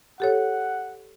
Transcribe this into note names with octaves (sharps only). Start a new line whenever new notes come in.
G4 A4 C#5 F#5